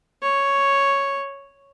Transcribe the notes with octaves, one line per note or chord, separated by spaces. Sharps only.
C#5